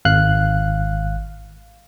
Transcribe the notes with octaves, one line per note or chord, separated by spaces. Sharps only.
G#1 F5 F#6